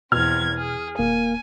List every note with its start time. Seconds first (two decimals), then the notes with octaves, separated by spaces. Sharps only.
0.12 E2 B2 C4 F6 G#6
0.56 G#4
0.99 D#1 A#3 G#5